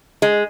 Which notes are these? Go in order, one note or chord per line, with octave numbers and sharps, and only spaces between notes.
G#3